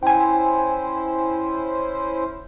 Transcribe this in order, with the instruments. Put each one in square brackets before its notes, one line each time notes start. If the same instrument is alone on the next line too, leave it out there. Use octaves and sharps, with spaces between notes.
[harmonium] C#4 E4 C5 [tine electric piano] G5 G#5